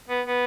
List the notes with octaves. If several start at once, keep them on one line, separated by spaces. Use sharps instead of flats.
B3
B3